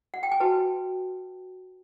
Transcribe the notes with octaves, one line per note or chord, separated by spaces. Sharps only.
F#5
G5
G#5
F#4 B4 A5